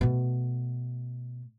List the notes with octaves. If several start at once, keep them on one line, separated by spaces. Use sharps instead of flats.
B2 A3